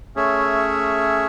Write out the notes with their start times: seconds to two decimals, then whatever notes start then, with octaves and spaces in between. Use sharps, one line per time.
0.16 A3 C#4 G#4 C#5 E5